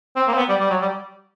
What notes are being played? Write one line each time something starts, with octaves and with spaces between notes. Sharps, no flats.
C4
A#3
C4
B3
G3
G3
F#3
G3